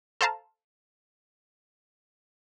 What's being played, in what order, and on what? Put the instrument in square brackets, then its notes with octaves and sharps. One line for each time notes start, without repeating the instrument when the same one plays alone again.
[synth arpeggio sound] A4 C5 F5 A5 A#5